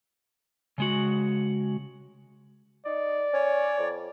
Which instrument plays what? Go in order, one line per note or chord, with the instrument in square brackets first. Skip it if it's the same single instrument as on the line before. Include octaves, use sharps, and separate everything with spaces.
[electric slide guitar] C#3 G#3 F#4
[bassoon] D#4 [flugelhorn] D5
[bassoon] C#4 [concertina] C#5
[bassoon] F2